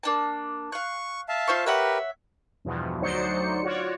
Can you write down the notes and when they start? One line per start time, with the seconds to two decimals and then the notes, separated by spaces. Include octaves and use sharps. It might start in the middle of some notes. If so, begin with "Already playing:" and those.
0.03 A#3 D4 A5
0.72 F5 C#6 F#6
1.29 E5 F5 A5
1.47 F4 C5 C#6
1.66 G4 A#4 B4 C#5 E5 F#5
2.65 E2 G2 B2 F3
3.00 D2 F#3 D#4 C5 D5 C#7
3.63 F4 F#4 C#5 D5